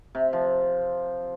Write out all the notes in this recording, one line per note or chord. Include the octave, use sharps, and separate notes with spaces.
C3
F3